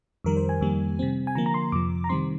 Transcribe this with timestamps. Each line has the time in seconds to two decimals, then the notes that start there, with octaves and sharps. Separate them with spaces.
0.24 F2 D#3 G3 A#4
0.37 C5
0.49 G#5
0.61 F2 D#3 G3 A#3
0.99 C3 G3 C4
1.27 G#5
1.35 D3 F3 A#3 A#5
1.46 A#5
1.54 C6
1.72 F2 C3 F3 D6
2.04 A#5
2.09 C3 D#3 G3 C4 C6